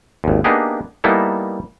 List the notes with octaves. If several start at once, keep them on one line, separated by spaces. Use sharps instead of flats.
G#1 D#2
A#3 B3 D4 D#4 G4 G#4
G3 A#3 B3 D#4 E4 A4